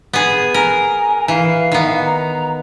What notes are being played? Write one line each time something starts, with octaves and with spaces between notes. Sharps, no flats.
B3 G#4
A#4 G#5
E3 F5
D#3 B3
A#5